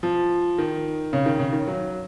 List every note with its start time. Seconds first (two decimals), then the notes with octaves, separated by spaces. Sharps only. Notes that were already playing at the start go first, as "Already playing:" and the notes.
0.03 F3
0.58 D#3
1.13 C#3
1.26 D#3
1.39 C#3
1.53 D#3
1.67 F#3